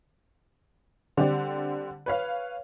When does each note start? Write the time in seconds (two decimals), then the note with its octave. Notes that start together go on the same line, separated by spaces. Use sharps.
1.17 D3 G3 C4 D4 G4
2.06 B4 C#5 F5